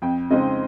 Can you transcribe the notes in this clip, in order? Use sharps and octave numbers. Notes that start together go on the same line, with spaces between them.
F2 G5
C#3 G#3 C4 D#4 D#5